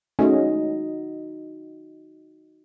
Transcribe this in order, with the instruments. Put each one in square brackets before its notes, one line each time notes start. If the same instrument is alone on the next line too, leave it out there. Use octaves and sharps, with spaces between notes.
[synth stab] G#3 A3 C#4 [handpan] D#4 F#4 D#5